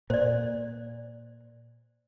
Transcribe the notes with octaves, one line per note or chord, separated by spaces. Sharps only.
A#2 C5 D5